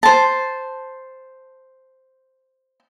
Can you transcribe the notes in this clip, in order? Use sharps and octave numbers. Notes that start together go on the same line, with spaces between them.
C5 A5